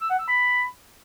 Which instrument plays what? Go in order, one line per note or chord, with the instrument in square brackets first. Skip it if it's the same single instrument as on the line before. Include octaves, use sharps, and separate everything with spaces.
[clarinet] E6
F#5
E6
B5